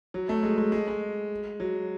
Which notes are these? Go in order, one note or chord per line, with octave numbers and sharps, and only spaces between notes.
F#3
A3
G#3
G#3
G#3
G#3
F#3